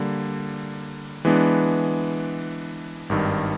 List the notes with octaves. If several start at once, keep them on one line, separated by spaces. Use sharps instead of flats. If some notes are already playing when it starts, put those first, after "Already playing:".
Already playing: D3 G3 A#3
E3 G#3 B3 D4
G#1 G2 D#3